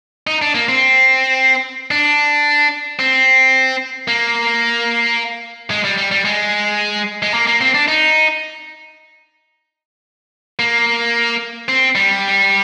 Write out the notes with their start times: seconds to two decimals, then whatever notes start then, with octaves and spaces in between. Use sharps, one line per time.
0.27 D#4
0.42 D4
0.55 A#3
0.69 C4
1.91 D4
2.99 C4
4.08 A#3
5.71 G#3
5.85 G3
5.98 G3
6.11 G3
6.25 G#3
7.22 G#3
7.34 A#3
7.47 A#3
7.61 C4
7.75 D4
7.88 D#4
10.59 A#3
11.69 C4
11.95 G3